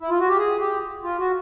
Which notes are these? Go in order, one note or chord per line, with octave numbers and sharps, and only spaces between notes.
E4
F4
F#4
G4
G#4
G4
F4
F#4